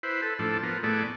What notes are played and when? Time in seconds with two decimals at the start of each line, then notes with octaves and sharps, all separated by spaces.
0.03 E4 B4 C5
0.22 A4 B4
0.39 A2 F3 D4 A4
0.63 F3 B3 A#4
0.83 A2 A3 B3 G#4 D5